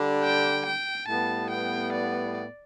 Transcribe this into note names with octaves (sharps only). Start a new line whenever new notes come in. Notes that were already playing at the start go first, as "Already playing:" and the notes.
Already playing: D3 G3 D4
G5
G5
A2 G3 B3 A5
G5
D5